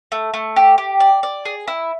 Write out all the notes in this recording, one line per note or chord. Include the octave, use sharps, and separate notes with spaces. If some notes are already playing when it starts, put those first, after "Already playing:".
A3
A3
G4
G4
D5
D5
G#4
E4